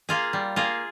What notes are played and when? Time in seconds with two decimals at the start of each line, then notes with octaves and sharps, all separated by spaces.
0.09 A#3 F4 G#4
0.33 G3
0.56 A#3 F4 G#4